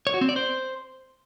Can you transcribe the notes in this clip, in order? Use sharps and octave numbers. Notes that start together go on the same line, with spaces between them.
C#5
F#4
C4
D5
C5